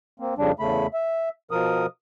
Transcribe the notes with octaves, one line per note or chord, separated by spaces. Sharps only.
A#3 C4
F2 C#3 G3 D4
E2 C#3 A3 B5
E5
B2 F3 A#4 D#6